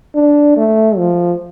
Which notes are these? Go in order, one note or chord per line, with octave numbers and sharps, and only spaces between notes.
D4
A3
F3